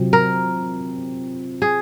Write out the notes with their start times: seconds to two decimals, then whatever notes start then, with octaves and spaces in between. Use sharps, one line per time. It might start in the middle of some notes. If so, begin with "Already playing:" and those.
Already playing: C3 F#3 C4 F4
0.13 A#4
1.62 G#4